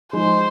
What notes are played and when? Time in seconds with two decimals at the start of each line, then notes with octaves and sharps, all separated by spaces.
0.13 F3 G#3 D#4 C5